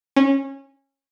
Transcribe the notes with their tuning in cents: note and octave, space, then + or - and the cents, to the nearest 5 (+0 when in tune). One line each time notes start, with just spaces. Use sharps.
C#4 -20